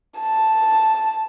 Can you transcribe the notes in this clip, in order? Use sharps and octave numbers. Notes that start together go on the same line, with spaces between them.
A5